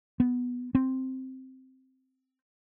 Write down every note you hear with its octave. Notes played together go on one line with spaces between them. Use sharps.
B3
C4